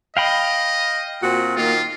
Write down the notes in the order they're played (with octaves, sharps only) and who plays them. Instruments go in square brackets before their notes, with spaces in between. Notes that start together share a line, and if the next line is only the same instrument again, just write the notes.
[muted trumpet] D#5 [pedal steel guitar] F5 G5 B5
[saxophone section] A#2 C4 F#4
[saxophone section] D#3 A#3 [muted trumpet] F4